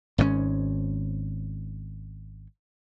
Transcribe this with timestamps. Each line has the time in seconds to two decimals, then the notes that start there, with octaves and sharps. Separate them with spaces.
0.18 G#1 G#2 B2 C#4